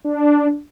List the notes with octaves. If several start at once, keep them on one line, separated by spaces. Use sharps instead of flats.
D4